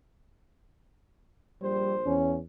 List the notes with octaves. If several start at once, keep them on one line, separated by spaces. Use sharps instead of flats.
A#1 G3 C5
E2 C#4